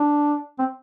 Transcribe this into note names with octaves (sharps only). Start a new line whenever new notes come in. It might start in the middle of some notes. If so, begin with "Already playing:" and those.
Already playing: D4
C4